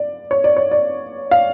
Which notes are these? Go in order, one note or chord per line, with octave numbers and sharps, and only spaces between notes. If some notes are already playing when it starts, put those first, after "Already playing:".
Already playing: D5
C#5
D5
C#5
D5
F5